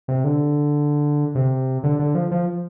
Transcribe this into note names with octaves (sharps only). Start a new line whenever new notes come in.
C3
D3
C3
D3
D3
F3
F3